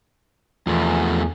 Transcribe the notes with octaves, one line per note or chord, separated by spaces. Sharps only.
E2 F3 A3